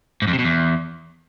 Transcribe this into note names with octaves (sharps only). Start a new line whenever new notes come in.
G#2
F2
C3
B2
E2